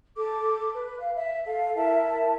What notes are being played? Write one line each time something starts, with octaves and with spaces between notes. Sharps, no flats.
A4 D6
B4
F5
E5
A4 F5
E4 A#4 E5 A5